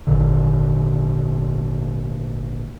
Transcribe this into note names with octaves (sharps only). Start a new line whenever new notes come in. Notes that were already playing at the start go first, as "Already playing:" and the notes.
G#1 A#2 D3